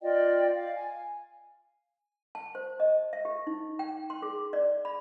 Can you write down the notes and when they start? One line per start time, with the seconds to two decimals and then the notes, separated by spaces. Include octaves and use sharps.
0.02 F4 D5 D#5 G5
0.55 F5
0.76 G#5
2.35 A5
2.55 C5
2.80 D#5
3.13 E5
3.25 G4
3.47 D#4
3.79 G5
4.10 C6
4.22 G#4
4.53 D5
4.85 B5